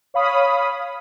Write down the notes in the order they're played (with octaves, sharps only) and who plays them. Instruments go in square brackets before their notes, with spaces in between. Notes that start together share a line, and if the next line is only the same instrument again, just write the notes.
[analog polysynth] C#5 F5 B5 D#6